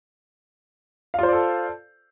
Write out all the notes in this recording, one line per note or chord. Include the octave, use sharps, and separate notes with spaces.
F4 A4 C5 D5 F5